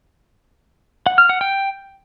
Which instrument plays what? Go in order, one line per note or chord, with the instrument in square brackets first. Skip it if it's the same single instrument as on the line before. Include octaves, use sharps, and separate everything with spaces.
[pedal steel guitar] F#5
F6
F#5
G5